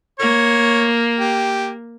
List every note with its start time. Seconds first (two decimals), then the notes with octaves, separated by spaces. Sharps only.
0.19 A#3 C#5
1.20 G4